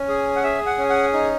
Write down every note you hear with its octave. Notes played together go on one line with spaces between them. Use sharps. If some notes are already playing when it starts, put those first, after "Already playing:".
Already playing: C#4
G#4
F#5
G#4 E5
F#5
C#4
F#5
D#4